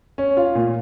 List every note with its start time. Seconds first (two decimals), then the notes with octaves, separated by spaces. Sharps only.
0.18 C#4
0.37 F4
0.55 A#2